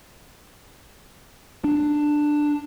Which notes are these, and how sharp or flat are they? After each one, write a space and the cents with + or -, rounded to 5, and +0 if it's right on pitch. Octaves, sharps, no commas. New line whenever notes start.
D4 +10